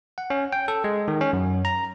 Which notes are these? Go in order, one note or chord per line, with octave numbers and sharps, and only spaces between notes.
F#5
C#4
G5
A4
G#3
D#3
C#4
F#2
A#5